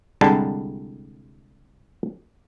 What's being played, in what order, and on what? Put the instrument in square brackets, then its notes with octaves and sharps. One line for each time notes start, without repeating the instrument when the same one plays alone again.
[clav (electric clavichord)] C2 D3 G3 G#3 A5